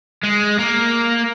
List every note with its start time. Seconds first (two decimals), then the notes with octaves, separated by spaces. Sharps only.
0.23 G#3
0.59 A#3